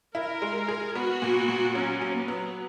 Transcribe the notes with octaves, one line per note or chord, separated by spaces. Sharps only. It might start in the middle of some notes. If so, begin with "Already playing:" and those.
E4 A#4
G#3
G#4
B3 F#4
A#2
A#2
F#3 C#4
F#3
B3
F#3